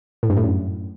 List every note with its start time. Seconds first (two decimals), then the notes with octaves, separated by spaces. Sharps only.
0.23 A2
0.30 G2
0.37 A2
0.44 F#2